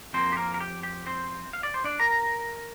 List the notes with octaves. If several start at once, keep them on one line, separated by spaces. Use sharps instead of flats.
F2 F3 A#3 C4 C5
G4
A#3 A#4
A#4
G4
G4
C4 C5
F5
D5
C5
D4 D5
A#4 A#5